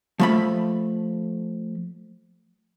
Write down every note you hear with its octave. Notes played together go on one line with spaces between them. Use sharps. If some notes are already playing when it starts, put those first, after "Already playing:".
F3 A3 B5